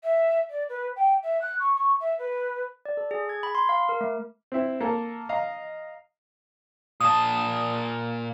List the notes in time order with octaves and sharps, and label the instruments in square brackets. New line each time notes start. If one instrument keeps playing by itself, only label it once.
[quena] E5
D5
B4
G5
E5
F#6
C#6
C#6
E5
B4
[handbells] D5
A4
G#4
G#6
B5
C6
F5
A#4
A3
[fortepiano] C4 E4
A#3 A4 A#4
D#5 F5 A#5
[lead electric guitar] A#2 A5 [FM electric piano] D#6